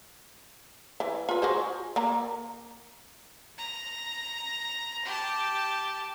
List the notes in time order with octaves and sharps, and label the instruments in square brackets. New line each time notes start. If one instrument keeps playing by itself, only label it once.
[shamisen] E3
F4 B4
F#4 G#4 C5
A#3 A#5
[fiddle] A#5
G4 A5